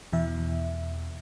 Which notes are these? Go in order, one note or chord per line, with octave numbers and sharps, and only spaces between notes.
E2 B2 E3 E5